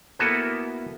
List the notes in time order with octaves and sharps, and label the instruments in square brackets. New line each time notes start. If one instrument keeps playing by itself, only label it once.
[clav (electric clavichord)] A#3 B3 E4 F#4 A4 B4